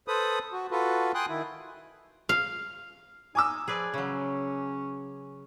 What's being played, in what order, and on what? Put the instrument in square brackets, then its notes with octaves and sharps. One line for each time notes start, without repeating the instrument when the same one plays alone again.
[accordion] A4 B4 C5 B5 D#6
F#4
F4 F#4 A4 B4
G5 G#5 C6 D#6 F#6
D#3 E4
[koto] F5
[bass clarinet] D#4 [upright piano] G#5 D6 E6
[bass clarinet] F3 [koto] G#4 B4 D5
[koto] C#3 F#3 [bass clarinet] C#4